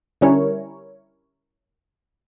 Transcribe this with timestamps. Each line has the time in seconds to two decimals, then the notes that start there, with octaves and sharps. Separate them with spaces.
0.21 D3 G3 C#4 E4 A#4 C#5